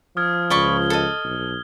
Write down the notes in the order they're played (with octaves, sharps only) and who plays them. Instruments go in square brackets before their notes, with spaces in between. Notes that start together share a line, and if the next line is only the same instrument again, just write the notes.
[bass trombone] F3 [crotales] D#6 F6 G#6
[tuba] C#2 [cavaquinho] D5 B5 C#6 [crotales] G7
[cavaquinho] A4 D#5
[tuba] B1